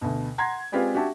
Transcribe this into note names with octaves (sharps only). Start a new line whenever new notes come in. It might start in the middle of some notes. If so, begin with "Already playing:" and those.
D2 B2
F#5 A#5 C6 G#6
G#3 C4 F4 G4 B4 D5
D4 F#4 G4 E5 A5